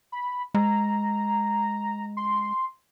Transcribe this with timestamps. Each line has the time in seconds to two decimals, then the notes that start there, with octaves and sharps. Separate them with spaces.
0.12 B5
0.54 G#3 A#5
2.17 C6